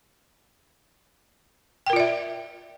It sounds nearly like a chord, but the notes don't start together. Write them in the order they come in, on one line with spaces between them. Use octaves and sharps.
G5 A#4 F4 D5 E5